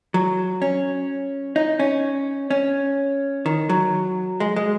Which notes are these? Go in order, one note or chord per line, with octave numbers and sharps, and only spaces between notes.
F#3
C#4
D#4
C#4
C#4
D#3
F#3
G#3
G#3